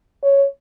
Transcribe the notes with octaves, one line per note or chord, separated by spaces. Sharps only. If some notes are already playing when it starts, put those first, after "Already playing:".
C#5